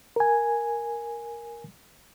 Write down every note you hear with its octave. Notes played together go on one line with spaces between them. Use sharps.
A#4 G#5